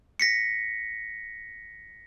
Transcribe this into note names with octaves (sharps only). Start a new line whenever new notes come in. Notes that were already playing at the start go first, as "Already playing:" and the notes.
A#6 B6 C#7